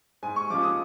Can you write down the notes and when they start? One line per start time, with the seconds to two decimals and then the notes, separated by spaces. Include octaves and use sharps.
0.23 G#2 G#5
0.36 C#6
0.50 F3 G#3 C#4 F4 D6
0.63 D#6